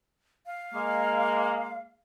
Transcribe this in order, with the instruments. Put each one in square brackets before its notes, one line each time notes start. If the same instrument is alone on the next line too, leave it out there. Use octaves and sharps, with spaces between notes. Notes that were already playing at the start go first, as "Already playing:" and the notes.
[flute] F5
[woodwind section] G#3 A#3